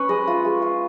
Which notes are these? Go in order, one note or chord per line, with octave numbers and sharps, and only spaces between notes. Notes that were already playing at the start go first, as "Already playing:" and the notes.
Already playing: C#4 B4 C#5
G#3 D#5
F4
G#3
F4